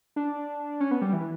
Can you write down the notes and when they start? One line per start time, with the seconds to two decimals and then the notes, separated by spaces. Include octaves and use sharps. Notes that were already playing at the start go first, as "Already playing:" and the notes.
0.16 D4
0.80 C#4
0.91 B3
1.02 G3
1.13 E3